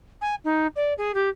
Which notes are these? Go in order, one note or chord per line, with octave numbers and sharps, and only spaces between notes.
G#5
D#4
D5
G#4
G4